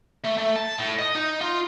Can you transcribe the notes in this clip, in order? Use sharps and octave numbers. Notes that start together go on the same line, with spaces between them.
A3
A3
A5
A2
D#5
D#4
F4